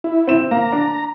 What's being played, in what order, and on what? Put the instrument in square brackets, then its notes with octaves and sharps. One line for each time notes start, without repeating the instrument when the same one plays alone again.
[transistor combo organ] E4
[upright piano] C4 E7
[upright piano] A#3 [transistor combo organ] A#5
[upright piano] D4